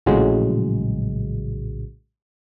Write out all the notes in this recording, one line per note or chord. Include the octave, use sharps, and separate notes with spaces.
A#1 A2 C#3 F#3 G#3